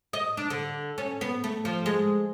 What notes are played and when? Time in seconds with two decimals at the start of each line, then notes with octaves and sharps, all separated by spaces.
0.13 D#5
0.37 D4
0.50 D3
0.98 C#4
1.21 B3
1.44 A3
1.65 F3
1.86 G#3